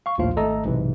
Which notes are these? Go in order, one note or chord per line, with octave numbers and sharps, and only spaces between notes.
F5 C#6
A#1 D#2 A2 F3 F4 F5
G#1 A3 A4 D#5 A#5
B1 G#2 C3 E3